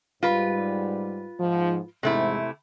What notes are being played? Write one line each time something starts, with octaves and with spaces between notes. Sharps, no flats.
G#2 G3 F4 B4
G#2 F3
E2 G#2 C3 A3 E4